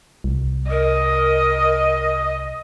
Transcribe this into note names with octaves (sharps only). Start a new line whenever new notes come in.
C2
A#4 D#5